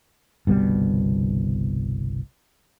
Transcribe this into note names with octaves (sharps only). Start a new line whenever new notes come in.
G1 C2 B2 G3